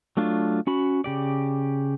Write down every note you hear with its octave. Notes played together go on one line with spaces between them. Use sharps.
F#3 A3 D4 F4
C#4 F#4 B5
C#3 G4 D5